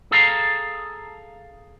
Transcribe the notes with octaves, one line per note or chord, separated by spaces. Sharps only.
G#4 A4 F5 A#5